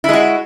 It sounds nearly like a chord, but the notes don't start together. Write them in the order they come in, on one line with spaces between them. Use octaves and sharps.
E4 G#3 F#4